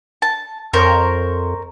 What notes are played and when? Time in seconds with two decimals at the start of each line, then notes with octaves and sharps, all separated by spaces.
0.22 A5
0.73 F2 A#4 C5 C#5